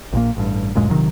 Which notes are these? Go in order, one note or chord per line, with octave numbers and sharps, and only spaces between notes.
A#1 A#2 A#3
A1 G2
D1 F#2 A#2 G#3
A#1 C3 D#3 F#3